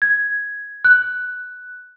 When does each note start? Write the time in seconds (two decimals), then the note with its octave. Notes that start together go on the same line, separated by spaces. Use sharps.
0.02 G#6
0.85 F#6